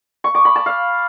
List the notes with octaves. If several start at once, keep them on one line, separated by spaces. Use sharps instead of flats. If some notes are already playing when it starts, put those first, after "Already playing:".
C#6
D6
B5
A5
F5